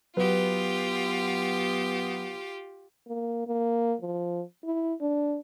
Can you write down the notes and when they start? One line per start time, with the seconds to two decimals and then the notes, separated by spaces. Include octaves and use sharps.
0.17 F#3 B3 F4 G4 B4
3.07 A#3
3.47 A#3
4.01 F3
4.64 E4
5.01 D4